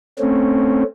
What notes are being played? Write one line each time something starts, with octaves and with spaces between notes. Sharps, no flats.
A3 C4 C#4